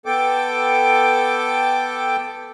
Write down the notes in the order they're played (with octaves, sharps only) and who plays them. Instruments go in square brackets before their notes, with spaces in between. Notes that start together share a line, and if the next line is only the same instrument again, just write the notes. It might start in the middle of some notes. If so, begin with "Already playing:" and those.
[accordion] B3 A4 G5 D6